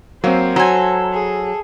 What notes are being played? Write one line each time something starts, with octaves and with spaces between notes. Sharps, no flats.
F#3 A#3 C4 C5
F#3 A4 G#5 A#5 C6
G#4